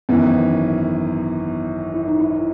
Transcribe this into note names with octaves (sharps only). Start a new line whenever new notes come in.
G#1 F#2 E3 B3
E4
D#4
E4